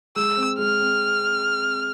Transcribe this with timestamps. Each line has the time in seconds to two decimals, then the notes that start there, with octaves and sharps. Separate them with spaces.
0.16 G#3 E6
0.37 C4
0.59 G#3 F6
0.79 C4